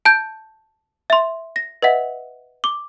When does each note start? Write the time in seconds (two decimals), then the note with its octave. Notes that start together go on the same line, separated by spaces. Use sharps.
0.05 A5 G6
1.10 E5 C6
1.56 A#6
1.82 B4 D#5 E5 F#5
2.64 D6